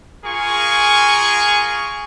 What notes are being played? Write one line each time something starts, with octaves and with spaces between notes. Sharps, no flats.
F4 G#4 A#4 G#5 C#6